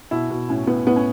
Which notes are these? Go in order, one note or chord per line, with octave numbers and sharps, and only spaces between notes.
B2 E4
B2
A2 C#4
A2 B3
A2 B3
C#4